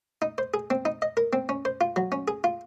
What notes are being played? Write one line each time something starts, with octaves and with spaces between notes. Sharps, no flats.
D#4
C5
G#4
C4
D#4
D#5
A#4
C4
C#4
C5
F4
F#3
C#4
G#4
F4